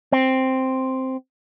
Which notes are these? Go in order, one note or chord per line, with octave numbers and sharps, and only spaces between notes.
C4